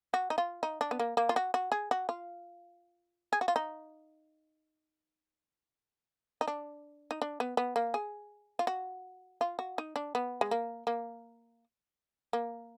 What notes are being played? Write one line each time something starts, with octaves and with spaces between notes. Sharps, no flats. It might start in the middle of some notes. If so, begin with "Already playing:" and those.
F#4
D#4
F4
D#4
D4
B3
A#3
A#3
F4
F#4
F#4
G#4
F#4
F4
G#4
F#4
F4
D#4
D#4
D4
D#4
D4
B3
B3
A#3
G#4
F4
F#4
F4
F#4
D#4
D4
B3
G#3
A#3
A#3
A#3